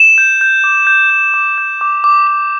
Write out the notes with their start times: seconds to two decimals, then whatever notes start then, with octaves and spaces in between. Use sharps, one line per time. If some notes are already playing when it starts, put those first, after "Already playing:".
Already playing: E7
0.18 G6
0.41 G6
0.64 D6
0.87 G6
1.10 G6
1.34 D6
1.58 G6
1.81 D6
2.04 D6
2.27 D6